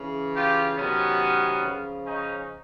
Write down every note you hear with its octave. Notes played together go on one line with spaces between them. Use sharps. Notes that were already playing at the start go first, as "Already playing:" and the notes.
Already playing: C#3 E3
F4 G4
C3 D#3 F#3 B3 C#4
C#3 F3
C#4 D#4